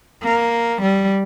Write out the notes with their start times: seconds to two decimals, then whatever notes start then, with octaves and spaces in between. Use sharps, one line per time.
0.23 A#3
0.82 G3